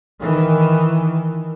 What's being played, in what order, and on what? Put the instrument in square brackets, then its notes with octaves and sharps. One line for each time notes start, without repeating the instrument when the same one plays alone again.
[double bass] D#3 E3